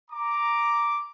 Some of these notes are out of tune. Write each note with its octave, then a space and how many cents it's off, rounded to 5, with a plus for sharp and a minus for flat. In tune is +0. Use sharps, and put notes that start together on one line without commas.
A#5 +0 D6 +0